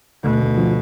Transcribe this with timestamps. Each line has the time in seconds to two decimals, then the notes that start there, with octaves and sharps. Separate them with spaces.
0.23 D2 B2
0.41 D2
0.57 F3